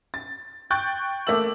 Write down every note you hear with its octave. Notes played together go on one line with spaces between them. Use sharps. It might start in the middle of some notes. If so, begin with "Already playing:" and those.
A6
G5 C#6 F#6 G6 A6
A3 A#3 D6 E6 F#7